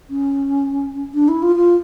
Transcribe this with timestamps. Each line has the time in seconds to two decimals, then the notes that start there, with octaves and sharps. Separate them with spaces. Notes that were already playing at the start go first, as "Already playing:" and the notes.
0.10 C#4
1.14 D4
1.28 E4
1.43 F4
1.56 F4